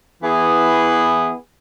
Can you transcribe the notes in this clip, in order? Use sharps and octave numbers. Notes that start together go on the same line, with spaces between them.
E3 B3 E4 G#4